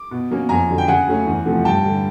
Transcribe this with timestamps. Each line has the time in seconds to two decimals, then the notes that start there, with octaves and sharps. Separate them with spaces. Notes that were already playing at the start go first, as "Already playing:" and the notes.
Already playing: D6
0.11 B2
0.31 F#3 A#3 C#4
0.49 F2 G#5 A#5
0.68 D3 F#3
0.78 G5
0.88 C#3 F#5 G#5
1.07 F#3 A3 C#4
1.26 E2
1.46 C3 F3 A3
1.65 G2 G5 A5
1.84 D3 G3